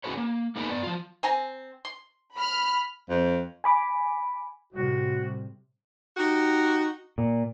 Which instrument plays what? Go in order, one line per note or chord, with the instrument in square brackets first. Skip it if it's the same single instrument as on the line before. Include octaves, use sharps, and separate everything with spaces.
[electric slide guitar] C#4 F#4 G#4 B4 C#5
A#3
A#3 B3 D#4 G#4 A#4 B4
B3 D5
F3 F4
[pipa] C4 G#5 A#5
C6
[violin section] B5 F6
[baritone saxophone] F2
[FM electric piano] G#5 B5 D6
[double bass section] A2 C3 G3 [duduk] F#4
[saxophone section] D#4 F#4 G4
[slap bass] A#2